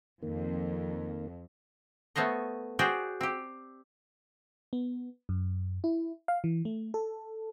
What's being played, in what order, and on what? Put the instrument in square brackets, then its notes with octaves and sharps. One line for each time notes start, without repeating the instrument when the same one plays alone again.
[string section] F2 [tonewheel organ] D#3 A#3
[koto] A3 B3 C5 C#5 D#5
F#4 G#4 C5 D5 G5
C4 G4
[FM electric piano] B3
F#2
E4
F5
E3
A3
A4